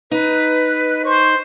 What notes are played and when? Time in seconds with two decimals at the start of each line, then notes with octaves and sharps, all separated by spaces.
0.11 D#4 B4
1.05 C5 C#6